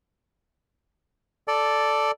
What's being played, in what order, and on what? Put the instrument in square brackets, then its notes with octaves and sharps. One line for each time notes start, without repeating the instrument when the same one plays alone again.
[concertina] A4 D5